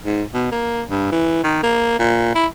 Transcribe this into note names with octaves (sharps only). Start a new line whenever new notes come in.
G#2
B2
A#3
G2
E3
D#3
A#3
A#2
E4